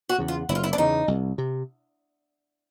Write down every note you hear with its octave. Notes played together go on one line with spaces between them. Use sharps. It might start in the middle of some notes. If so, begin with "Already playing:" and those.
F#4
E2 C#3
F4
F#1 E4
F4
E4
D4
E2 C#3 D#4
C2
C3